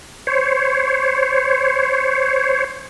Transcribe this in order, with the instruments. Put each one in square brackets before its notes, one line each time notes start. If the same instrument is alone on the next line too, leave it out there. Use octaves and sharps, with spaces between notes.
[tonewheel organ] C5 C#5